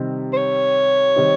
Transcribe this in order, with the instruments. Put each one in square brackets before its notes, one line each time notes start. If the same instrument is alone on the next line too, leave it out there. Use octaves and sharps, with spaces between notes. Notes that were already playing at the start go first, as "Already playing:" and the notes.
Already playing: [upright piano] C3 D#3 G3 C4
[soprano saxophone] C5
C#5
[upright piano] D#3 G3 C4 D#4